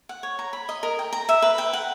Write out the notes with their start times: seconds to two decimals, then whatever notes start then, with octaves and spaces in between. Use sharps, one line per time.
0.09 F#5
0.23 C#5
0.39 A#5
0.53 B5
0.69 D#5
0.83 A#4
0.99 G5
1.13 A#5
1.29 E5
1.42 B4
1.58 G5
1.73 F#5